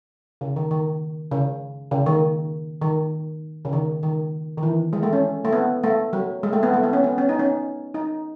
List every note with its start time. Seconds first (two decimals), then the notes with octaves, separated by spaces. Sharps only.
0.41 C#3
0.56 D#3
0.71 D#3
1.31 C#3
1.91 C#3
2.06 D#3
2.82 D#3
3.65 C#3
3.73 D#3
4.03 D#3
4.58 D#3
4.63 E3
4.93 G#3
5.03 A3
5.13 C#4
5.45 A3
5.53 B3
5.84 A3
6.13 F#3
6.43 G#3
6.53 A3
6.63 B3
6.74 A3
6.83 B3
6.93 C#4
7.04 B3
7.18 C#4
7.29 D#4
7.39 C#4
7.94 D#4